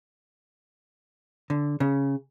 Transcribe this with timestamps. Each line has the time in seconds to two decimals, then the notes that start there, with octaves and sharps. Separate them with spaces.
1.50 D3
1.80 C#3